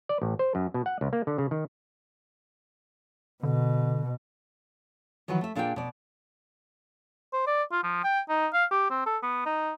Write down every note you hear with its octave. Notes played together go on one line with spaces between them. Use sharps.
D5
A1
C5
F#2
B2
F#5
C#2
A#3
D3
C#3
D#3
B2 D3
D#3 E3 F#3 B4 F#5
A3 E5
A#2 D4 G#4 A#4 D5 G5
B2 D5
C5
D5
F4
F3
G5
D#4
F5
G4
C4
A4
B3
D#4